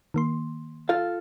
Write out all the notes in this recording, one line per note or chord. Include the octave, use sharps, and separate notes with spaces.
D#3 A#3 C6
F4 A4 F5